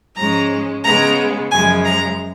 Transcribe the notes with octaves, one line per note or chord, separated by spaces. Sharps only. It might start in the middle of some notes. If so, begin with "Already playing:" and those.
G#2 F3 G#3 C#4 A#5
C#3 G#3 B3 A#5
F#2 C#3 F3 G#3 G#5
A#5